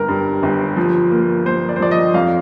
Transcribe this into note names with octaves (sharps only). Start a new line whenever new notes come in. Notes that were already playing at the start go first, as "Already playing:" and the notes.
Already playing: G1 A#4
G2
G1
F3
A#3
A#3 C5
D5
C5
F3 D5
D#5
F2 F5